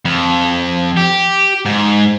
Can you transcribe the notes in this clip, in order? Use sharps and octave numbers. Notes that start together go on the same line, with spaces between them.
F2
G4
G#2